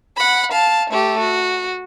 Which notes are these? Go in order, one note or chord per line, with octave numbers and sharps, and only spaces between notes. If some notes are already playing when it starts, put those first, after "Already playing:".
F#5 B5
F5 A5
A3 G4
F#4